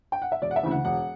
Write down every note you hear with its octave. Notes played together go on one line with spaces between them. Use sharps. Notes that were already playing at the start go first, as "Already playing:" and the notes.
G5
F#5
E5
E1 D5
F#5
E5
D2 C#3 E3
F#5
E1 F#5